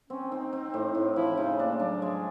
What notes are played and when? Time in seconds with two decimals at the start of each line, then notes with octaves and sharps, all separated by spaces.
0.09 C4 C#4
0.31 C4 D#4
0.53 C4
0.74 A2
0.95 A2
1.12 D#4
1.16 F3 E4
1.37 C#3 D#4
1.59 A#3 D4
1.80 F#3 D4
2.02 G#3